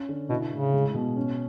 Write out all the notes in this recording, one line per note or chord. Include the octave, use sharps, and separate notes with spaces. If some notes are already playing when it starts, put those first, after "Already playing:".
Already playing: C#4
D3
B2 E4
A2 C#3
G#3
B2
C#4